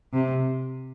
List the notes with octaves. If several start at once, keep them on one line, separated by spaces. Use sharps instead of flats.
C3